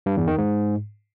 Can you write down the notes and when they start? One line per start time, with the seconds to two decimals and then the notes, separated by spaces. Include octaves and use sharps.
0.06 G2
0.17 E2
0.27 D#3
0.38 G#2